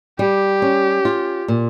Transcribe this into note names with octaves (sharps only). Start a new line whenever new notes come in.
G3 G4
C#4
F4
A#2